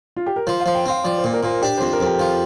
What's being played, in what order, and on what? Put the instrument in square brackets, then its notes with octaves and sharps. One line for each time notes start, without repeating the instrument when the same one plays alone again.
[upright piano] F4
G4
A#4
[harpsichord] F3 [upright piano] C5
[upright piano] F5
[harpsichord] F3
[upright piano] G5
[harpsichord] C4 [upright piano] F5
[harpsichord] F3 [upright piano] D5
[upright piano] C5
[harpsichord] A#2
[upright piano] A#4
[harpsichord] A#2 [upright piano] C5
[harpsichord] D4 [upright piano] G4
[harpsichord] F2 [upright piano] C5
[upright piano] A#4
[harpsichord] F2
[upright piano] G4
[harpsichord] F3 [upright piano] F4